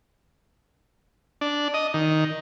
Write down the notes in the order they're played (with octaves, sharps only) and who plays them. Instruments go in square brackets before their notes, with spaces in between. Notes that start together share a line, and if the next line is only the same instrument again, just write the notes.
[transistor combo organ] D4
D#5
D#3